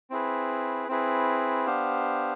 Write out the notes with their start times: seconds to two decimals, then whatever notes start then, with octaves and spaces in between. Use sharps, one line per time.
0.10 C4 E4 G#4 B4
0.88 C4 E4 G#4 B4
1.66 B3 D4 G4 C5 F5